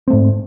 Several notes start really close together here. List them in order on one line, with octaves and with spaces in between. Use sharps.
C4 A3 G#2